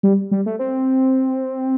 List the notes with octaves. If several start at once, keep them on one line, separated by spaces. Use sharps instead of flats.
G3
G3
A3
C4